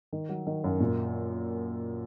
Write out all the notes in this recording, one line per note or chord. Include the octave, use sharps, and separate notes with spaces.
D#3
F#3
D#3
F#2
A#2